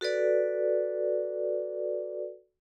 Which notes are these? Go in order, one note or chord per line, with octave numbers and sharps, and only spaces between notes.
F#4 A4 B4 D5